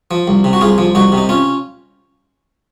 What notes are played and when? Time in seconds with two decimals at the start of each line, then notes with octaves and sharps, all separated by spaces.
0.11 F3
0.28 C2
0.44 C3
0.53 F#4
0.61 C2 F4 G#4
0.78 F3
0.95 C2 D#4 F#4
1.12 C3
1.17 D#4
1.29 C#4 F4